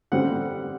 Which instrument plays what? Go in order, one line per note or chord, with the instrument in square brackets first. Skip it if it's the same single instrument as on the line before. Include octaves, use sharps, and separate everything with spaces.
[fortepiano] D3 G3 C4 F#5